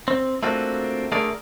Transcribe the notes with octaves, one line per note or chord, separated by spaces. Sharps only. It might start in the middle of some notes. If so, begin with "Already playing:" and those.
C4
A3 A#3 C4 D4 F4 F#4
D3 A3 G#4 A#4 D5